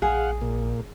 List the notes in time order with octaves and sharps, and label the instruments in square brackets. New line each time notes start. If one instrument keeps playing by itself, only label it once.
[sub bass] A#1 [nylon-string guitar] G#4 [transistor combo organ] F5 F#5
[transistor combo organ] A#2